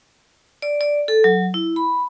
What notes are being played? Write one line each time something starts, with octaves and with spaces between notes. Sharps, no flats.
D5
D5
A4
F#3
E4
B5